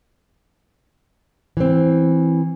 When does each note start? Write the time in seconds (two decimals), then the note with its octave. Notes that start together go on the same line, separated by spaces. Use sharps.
1.57 E3 C4